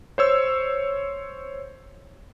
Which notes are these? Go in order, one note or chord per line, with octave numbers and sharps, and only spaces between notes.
C5 C#5 E6